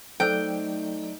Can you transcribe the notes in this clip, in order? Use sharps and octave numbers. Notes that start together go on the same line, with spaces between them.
F#3 A3 D#4 A4 C5 D5 G5 E6